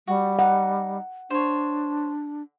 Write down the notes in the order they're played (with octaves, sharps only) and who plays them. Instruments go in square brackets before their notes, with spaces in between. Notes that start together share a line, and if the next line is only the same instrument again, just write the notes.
[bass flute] G3 [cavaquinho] F#4
[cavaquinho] D#4 [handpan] F#5
[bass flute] D4 [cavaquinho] C5 C#5